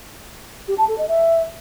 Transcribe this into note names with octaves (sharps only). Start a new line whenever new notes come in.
G4
A5
A4
D#5
E5